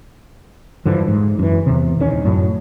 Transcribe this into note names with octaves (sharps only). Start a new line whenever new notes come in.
G2 D3 E3 F3
G#2
F#2 E3
E2 C3
D#1 C2 D#3 C#4
F#2 A2 F#3